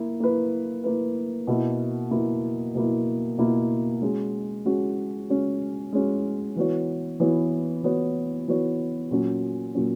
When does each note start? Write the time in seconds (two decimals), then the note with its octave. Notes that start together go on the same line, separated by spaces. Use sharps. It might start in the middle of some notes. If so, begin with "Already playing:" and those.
Already playing: A#3 E4
0.20 A#3 E4 B4
0.84 A#3 E4 B4
1.47 B2 A#3 E4
2.11 B2 A#3 E4
2.75 B2 A#3 E4
3.38 B2 A#3 E4
4.02 G#3 C#4 F#4
4.65 G#3 C#4 F#4
5.29 G#3 C#4 F#4
5.93 G#3 C#4 F#4
6.56 E3 B3 F#4 C#5
7.20 E3 B3 F#4 C#5
7.83 E3 B3 F#4 C#5
8.48 E3 B3 F#4 C#5
9.11 A#2 F#3 C#4
9.75 A#2 F#3 C#4